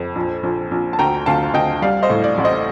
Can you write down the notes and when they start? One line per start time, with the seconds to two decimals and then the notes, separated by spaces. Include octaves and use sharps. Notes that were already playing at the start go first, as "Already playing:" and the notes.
Already playing: F2
0.15 A#1
0.43 A#1
0.71 A#1
0.93 A5
0.99 D2 G5 A#5
1.26 D2 F5 A5
1.54 D2 D#5 G5
1.82 G3 D5 F5
2.03 C5 D#5
2.10 A2
2.24 D5
2.38 A1
2.44 C5 D#5